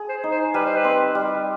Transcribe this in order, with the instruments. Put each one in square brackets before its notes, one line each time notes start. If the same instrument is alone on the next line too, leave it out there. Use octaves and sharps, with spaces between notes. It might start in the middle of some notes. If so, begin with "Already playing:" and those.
Already playing: [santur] G#4
[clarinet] C5
[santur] D#4
[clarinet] C5
[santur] G3 [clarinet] B4
[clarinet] C5
B4
[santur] C4
G3